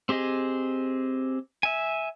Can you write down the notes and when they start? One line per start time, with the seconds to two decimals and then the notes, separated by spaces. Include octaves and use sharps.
0.09 C4 G4 G#4 D#5
1.63 E5 G#5